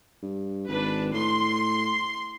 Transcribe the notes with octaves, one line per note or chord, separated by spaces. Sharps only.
G2
G#1 D4 B4
A2 C6